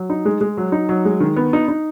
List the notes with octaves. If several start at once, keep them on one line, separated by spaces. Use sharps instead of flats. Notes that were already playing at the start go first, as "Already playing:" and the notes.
Already playing: F#3
D#4
G#3
G#3
F#3
D#4
F#3
G#3
D#3
B3
D#4
D#4